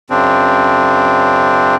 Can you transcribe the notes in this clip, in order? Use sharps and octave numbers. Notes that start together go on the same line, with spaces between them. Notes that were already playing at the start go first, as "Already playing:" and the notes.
F#2 C#3 C4 D4